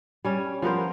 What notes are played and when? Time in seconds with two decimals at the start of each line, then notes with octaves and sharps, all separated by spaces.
0.25 G3 C#4
0.62 F3 B3 A#4 C5